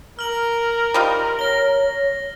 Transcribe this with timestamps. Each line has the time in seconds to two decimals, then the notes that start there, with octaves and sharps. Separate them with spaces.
0.19 A#4 F6 F#7
0.94 G3 D#4 F4
1.39 C#5 A#6 G7